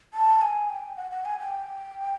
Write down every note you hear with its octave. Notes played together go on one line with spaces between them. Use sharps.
A5
G#5
G5
F#5
F#5
G#5
G5